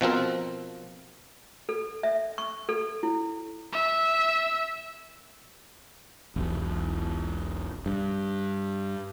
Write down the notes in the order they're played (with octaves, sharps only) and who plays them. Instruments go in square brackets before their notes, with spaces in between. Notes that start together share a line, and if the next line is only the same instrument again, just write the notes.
[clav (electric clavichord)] B2 F3 C4 A#4
[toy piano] A4
E5
C#6
A4
E4
[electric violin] E5
[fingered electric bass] E1 B1
G2